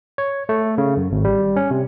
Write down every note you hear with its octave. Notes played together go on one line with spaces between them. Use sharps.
C#5
A3
C#3
F#2
G#1
G3
C#4
C3